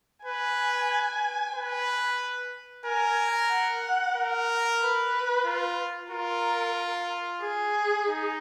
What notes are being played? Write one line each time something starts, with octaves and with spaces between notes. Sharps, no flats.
B4 G#5
B4
A#4 G#5
F#5
A#4
B4
F4
F4 A#4
G#4
D#4